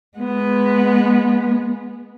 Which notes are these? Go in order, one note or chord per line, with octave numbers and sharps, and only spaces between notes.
G#3 B3